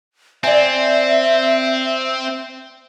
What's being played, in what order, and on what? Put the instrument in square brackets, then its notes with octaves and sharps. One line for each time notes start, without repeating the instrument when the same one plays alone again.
[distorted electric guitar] C4 [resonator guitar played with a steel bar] D5 G#5 [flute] E5